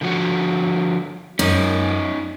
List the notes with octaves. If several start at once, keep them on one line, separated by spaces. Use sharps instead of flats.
D3 F3 F#4
F#2 C#4 D#4